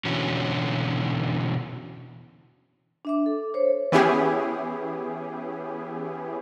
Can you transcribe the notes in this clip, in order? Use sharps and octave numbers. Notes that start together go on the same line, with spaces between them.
B2 D3 E3 C#4 F#4
D4 E5 D6
A4
C5 C#5
E3 B3 C#4 E4 G4 G#4